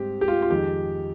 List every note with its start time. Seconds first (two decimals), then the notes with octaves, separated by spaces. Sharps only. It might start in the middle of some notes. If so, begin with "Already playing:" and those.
Already playing: G#2 G3 C4 G4
0.21 G4
0.28 F4
0.42 F4
0.50 F2 D#3 G#3 G4